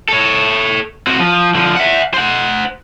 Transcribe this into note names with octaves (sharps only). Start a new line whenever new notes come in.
A4 C#5
C4 F#4
F3
D3 F3
E5 F#5
C5 F#5